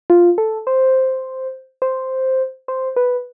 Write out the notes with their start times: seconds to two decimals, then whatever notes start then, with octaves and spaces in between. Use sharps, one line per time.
0.10 F4
0.38 A4
0.67 C5
1.82 C5
2.68 C5
2.96 B4